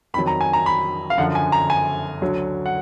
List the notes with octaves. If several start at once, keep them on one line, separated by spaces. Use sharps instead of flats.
F2 D#3 F#3 B5
A#5
G#5
A#5
B5
F5
F#2 D3 F3 F#5
G#5
A#5
G#5
D2 D3 F#3
F#5